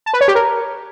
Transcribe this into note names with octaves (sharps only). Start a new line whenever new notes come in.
A5
B4
C#5
G4
A#4